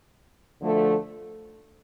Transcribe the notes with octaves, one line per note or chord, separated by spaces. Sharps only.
D2 D3 F3 A3